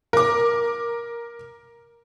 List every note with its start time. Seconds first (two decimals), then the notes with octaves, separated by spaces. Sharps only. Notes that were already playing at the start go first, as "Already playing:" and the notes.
0.13 A#4 D6